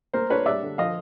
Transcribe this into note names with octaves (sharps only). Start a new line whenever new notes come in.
A#3 A#4 C5
D4 B4 C#5
G3 D5 E5
D3
F3 D#5 F5